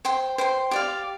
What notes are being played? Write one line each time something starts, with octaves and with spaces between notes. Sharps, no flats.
C5 G5 C6
C5 G5 C6
G4 D5 F5